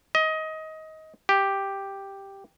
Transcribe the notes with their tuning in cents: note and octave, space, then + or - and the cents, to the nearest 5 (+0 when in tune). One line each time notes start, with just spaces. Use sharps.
D#5 +20
G4 +0